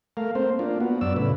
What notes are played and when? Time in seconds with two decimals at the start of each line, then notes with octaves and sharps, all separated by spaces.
0.17 A3 A#4 F5
0.35 A#3 C4 C5
0.59 A#3 D4 F4
0.80 B3 F#4
1.01 F#2 D5 E6
1.16 A2 C#3 B4